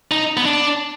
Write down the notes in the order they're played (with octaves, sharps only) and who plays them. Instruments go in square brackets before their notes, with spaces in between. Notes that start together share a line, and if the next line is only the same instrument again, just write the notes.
[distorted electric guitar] D#4
B3
D4